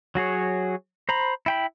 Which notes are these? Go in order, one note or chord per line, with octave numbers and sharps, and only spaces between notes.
F#3 F#4 G#4 C#5
C5 A#5 B5
E4 G5 B5